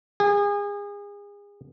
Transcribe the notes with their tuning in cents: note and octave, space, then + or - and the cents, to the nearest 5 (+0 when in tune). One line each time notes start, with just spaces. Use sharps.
G#4 -30